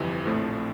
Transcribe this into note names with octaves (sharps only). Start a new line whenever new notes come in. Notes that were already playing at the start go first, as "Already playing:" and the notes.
Already playing: G1 F2 C3 E3
A#1 A2 F3 A3 C4